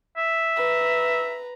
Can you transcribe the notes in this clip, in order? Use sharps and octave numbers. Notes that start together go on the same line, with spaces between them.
E5
B4 A#5